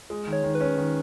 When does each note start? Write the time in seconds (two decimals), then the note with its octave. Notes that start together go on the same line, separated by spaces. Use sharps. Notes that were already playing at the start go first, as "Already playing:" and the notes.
0.10 G#3
0.27 D#3
0.33 C#5
0.43 D#3
0.55 B4
0.60 C#4
0.78 D#3